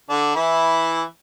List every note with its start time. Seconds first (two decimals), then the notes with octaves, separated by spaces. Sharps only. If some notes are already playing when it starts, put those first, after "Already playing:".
0.10 D3 D4
0.35 E3 E4